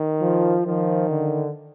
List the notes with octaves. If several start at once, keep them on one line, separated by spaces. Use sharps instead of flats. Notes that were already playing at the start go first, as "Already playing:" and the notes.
Already playing: D#3
F3
D#3 F3
D3